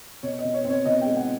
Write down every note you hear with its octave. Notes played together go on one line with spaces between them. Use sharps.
B2 C#5
D#5
B2
C#5
C4
C#5
B2 D#5
G5
G#3
F#5